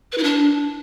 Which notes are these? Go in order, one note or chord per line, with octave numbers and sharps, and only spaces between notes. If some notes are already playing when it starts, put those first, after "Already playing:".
B4
E4
D4